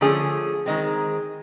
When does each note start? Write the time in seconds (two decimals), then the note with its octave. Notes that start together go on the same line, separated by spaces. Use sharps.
0.01 D3 F3 A3 C#4 G#4
0.66 D#3 G#3 C4